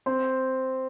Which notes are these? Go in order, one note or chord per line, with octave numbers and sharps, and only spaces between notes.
C4 C5